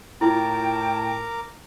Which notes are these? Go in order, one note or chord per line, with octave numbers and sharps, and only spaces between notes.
A2 E4 F4 A#4 G5 A5 A#5 D6